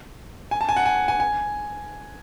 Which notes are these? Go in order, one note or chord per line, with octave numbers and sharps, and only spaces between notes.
G#5
A5
G#5
F#5
G#5
G#5
G#5